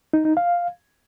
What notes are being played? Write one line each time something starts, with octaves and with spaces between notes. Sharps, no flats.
D#4
D#4
F5